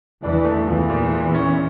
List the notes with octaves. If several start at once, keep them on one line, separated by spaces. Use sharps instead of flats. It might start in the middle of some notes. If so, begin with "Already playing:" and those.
E2 E3 D4
A3
E2 E3 F3
A#2
A#2
C#4